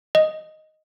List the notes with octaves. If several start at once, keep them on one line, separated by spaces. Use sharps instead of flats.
D#5